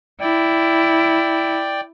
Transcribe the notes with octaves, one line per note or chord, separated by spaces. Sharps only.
E4 D5 G5